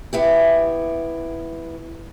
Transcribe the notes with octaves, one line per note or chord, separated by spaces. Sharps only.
B3 E4 G4